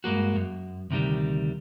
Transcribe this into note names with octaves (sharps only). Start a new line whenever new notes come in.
G2 G#3 A#3 F#4
F#2
D2 C3 D#3 G3